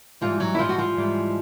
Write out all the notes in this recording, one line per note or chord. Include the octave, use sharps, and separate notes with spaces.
G#2 E3 F3 G3 F4
F#3 F#4
E4
F3 F4
F#4
F3 F4
G#2 E3 G3